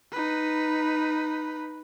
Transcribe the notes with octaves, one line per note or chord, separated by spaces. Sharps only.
D#4 B4